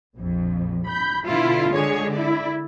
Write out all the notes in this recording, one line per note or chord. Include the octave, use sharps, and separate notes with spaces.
A#1 F2
B5 G6
B2 D3 E4 F4
D3 G#3 G#4 C#5
E4 D5